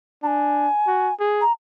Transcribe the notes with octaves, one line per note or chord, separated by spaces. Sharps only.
D4 G#5 A5
F#4
G#4
A#5